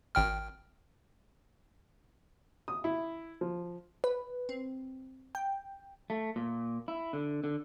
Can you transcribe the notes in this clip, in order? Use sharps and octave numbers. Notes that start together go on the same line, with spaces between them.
G#1 G5 F6
D#6
E4
F3
B4
C4
G5
A3
A#2
E4
D3
D3